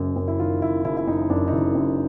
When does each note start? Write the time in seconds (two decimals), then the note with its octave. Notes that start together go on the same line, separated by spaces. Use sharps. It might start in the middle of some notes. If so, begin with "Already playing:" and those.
Already playing: F#1 F#2
0.16 F#2
0.28 E4
0.39 D#3 F4
0.62 F#1 E4
0.85 F#1 E4
0.97 E4
1.07 F#2 D#4
1.30 F#2 D4
1.48 D#4
1.52 F#1 E4
1.75 F#2